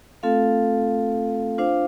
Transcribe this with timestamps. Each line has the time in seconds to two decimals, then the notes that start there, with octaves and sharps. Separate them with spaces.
0.23 A3 C4 F4 A4 F5
1.58 D4 F4 C5 F5